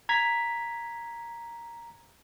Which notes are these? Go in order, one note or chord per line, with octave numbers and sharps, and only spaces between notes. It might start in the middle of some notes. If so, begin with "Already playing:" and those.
A#5 G#6 B6